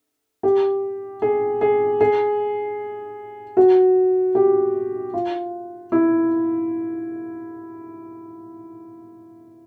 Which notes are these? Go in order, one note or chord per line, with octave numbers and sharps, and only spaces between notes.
G4
G#4
G#4
G#4
F#4
G4
F4
E4